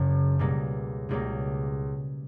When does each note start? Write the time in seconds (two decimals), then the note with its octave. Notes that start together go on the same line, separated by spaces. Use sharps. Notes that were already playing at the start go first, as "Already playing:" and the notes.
Already playing: F#1 F#2 C#3
0.39 C#2 B2 G3 A#3
1.09 C#2 B2 G3 A#3